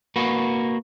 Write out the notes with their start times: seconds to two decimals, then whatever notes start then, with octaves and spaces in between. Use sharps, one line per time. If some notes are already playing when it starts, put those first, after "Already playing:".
0.16 A#3 F#4 B4